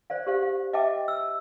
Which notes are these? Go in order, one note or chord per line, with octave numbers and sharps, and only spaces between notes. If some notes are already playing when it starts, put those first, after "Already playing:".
C5 D5 F5
G4 C5 F5
F5
D#5 E5 G5 A5 D6
E6